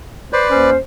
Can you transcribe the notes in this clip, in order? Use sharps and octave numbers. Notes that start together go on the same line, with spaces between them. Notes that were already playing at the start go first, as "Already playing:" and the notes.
B4 C5 D5
D#2 C#4 C5